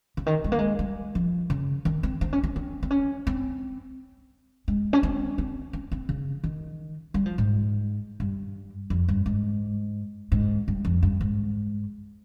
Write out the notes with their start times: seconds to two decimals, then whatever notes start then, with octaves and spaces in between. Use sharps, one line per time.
0.17 C#3
0.26 D#3
0.44 G#3
0.52 A#3
0.59 G#3
0.79 G3
1.15 F3
1.50 C#3
1.85 D#3
2.03 C4
2.21 C4
2.33 C#4
2.44 C#4
2.56 C4
2.83 C4
2.91 C#4
3.27 C4
4.68 G#3
4.93 C#4
5.03 C4
5.38 C4
5.73 C#4
5.92 C4
6.09 C#3
6.44 D#3
7.14 G3
7.26 F3
7.38 G#2
8.20 G2
8.90 F2
9.08 G2
9.26 G#2
10.32 G#2
10.68 G2
10.85 F2
11.03 G2
11.21 G#2